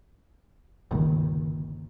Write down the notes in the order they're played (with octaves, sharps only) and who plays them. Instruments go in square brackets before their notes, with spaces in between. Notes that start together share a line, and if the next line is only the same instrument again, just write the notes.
[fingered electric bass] G1 C#2 A#2 D#3